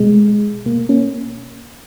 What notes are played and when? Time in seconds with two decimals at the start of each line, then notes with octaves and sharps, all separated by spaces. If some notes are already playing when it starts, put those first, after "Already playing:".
Already playing: B2 G#3
0.66 B2 A#3
0.89 A#3 C#4